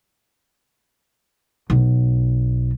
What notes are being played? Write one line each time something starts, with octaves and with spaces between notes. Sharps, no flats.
B1